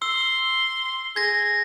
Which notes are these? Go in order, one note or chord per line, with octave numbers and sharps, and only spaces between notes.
C6 E6
G#4 G#6 A#6